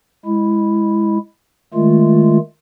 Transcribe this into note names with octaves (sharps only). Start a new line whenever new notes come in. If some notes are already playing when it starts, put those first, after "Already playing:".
G#3 E4
D#3 G#3 A3 F4